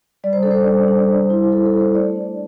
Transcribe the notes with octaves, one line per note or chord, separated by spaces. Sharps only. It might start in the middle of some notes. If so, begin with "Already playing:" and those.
G3 D5
C5
D4 A4
C5
G3
D4
G3
E4
G3 A4
A4
E4
C5
A3 D5
D4